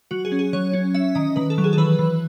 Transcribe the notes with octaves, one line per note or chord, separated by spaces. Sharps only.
F#3 F#4
G#4
C#4
G#4
F#3 C#5
C#4
C#4 E5
D#3 D#5
D#3 B4
A4
F#3
G#4
A4
E3 B4
E3